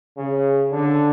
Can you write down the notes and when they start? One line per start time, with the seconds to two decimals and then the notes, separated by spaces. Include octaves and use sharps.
0.18 C#3
0.71 D3